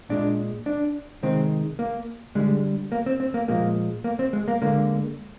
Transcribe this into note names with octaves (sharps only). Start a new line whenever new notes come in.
A#2 G#3 D4
D4
C3 D#3 G#3 C4
A#3
D3 G3 G#3
A#3
C4
C4
A#3
A#2 F3 G#3 A#3
A#3
C4
G#3
A#3
D3 G#3 A#3